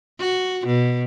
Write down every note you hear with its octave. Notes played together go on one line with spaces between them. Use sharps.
F#4
B2